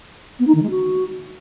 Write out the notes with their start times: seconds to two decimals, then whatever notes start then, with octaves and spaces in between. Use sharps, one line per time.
0.39 B3
0.47 D#4
0.55 D#3
0.63 G#3
0.70 F#4